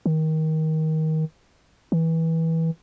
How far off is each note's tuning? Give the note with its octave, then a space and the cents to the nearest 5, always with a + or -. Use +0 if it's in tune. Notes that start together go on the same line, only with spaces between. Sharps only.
D#3 +20
E3 -20